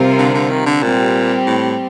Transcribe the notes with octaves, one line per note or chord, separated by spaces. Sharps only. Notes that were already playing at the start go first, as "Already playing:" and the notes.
Already playing: C3 G3 C4 F4 A#4
D3
D3
D#3
D3
A#2 G3 C4 G4
A2